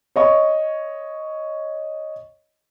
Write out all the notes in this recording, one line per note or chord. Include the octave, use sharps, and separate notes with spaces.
C#5 D#5 C#6